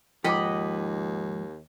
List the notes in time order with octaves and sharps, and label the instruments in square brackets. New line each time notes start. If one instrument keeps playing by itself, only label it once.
[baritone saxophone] D#2 [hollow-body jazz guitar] G#2 F3 [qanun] D#5 F#5 B5 [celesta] G5 D6